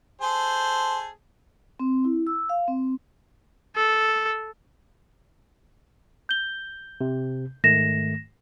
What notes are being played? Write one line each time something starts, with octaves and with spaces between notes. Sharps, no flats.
G#4 A4 C5
C4
E4
E6
F5
C4
A4
G6 G7
C3
G#2 D#3 A3 A#6 E7